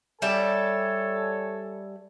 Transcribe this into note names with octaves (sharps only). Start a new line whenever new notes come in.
G3 A4 C#5 D5 E5 G#5